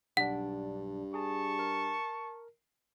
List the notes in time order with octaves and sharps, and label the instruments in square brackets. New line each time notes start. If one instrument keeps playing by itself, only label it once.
[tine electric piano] B1 D4 [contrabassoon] G2 [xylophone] F#5
[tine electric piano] G#4 [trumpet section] A5 C#6
[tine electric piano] A#4